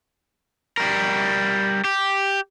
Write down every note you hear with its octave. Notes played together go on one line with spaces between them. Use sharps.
G3 A#4
G4